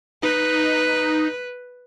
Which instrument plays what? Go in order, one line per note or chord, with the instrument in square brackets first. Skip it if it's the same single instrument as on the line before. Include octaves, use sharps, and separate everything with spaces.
[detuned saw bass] D#4 [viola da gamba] B4